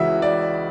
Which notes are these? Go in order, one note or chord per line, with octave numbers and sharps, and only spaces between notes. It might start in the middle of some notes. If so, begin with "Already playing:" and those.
Already playing: C#2 C#3 E3 F#4 E5
D5